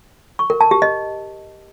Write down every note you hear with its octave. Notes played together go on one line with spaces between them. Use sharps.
C#6
A#4
A5
G4
D#5